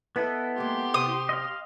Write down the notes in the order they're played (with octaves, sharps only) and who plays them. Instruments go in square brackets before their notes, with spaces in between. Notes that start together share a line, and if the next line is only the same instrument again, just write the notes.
[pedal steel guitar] B3 E4 A4 [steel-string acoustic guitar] B4 D#5
[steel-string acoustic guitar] G#3 A#3 [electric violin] G4 C6
[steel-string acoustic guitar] C3 [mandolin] D#6
[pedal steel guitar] D#5 F5